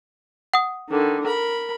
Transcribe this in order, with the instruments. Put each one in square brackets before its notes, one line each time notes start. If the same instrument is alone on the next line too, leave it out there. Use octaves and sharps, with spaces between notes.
[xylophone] F#5 D#6
[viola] D3 D#3
A#4 B5